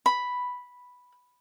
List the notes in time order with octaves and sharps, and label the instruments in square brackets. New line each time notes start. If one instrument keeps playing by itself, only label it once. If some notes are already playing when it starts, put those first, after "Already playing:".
[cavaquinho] B5